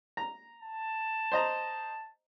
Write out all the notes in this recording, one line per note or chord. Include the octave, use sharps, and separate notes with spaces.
A#5
A5
C5 D#5 A#5